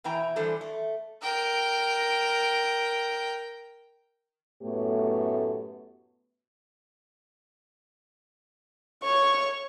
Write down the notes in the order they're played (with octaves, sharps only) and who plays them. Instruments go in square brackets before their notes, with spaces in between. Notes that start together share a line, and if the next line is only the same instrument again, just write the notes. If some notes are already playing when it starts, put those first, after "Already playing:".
[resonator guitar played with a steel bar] B2 E3 E4 G5 A#5
D3 E3 G3 A4 C5
A3
[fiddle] A#4 G5
[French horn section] F#2 A2 A3 B3 G4 C#5
[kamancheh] C#5 C#6